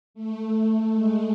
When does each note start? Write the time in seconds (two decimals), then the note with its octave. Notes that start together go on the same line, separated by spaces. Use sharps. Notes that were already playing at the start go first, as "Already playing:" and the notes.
0.14 A3
0.94 G#3